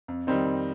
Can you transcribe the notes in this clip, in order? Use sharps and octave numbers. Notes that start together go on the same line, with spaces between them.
F2
D#3 G3 C4 D#4
F2